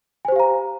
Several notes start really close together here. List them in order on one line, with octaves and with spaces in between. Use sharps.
G#5 C5 G4 F5 A#5